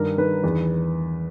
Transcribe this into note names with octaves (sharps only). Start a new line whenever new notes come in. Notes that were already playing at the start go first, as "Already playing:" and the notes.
Already playing: G2 D#3 A#4
D#3 B4
E2